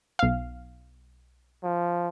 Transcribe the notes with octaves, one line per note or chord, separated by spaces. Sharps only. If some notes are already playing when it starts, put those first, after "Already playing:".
B1 F5
F3